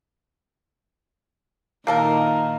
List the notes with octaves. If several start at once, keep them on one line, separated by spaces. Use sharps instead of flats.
A#2 D#3 A#3 A4 A#4